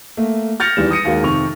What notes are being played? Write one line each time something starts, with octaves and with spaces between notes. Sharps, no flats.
A3 A#3
F6 G6 A6 A#6 C#7 F7
E2 D#3 G3 E7
D#6 A#6 C#7 D#7
D#2 G#3 F#4 A#4 F5
F2 C3 D#3 C#6 F7